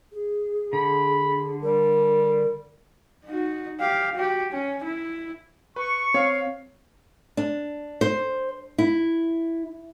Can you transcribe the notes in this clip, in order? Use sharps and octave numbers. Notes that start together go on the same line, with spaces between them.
G#4
D3 B5
G3 A#4
D#4 F#4
G4 F5
F#4 G4
C#4
E4
B4 C#6
C4 C#5 F5
D4
C5
E4